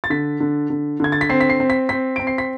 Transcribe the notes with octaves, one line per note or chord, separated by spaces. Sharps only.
A6
D3 B6
D3
D3
D3 G#6
A6
B6
C4 C7
B6
C7
C4
B6
C4 B6
C4 D7
C7
B6